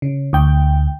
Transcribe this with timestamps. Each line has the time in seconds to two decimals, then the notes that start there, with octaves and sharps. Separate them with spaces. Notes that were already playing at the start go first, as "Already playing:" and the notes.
0.02 C#3
0.33 D2 G5